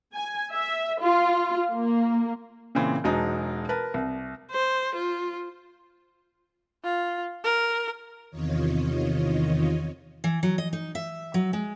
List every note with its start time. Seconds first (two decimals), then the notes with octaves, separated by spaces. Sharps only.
0.13 G#5
0.51 E5
1.00 F4
1.72 A#3
2.75 A#2 C#3 E3 C4
3.04 E1 F#3 G#3 D#4 A5
3.69 A#4 B4 A5
3.94 C2
4.51 C5
4.95 F4
6.83 F4
7.44 A#4
8.30 E2 C3 D#3 F4 C#5 D#5
10.24 E3
10.43 F#3
10.58 D#5
10.73 D#4
10.95 E5
11.34 F#3
11.53 G#3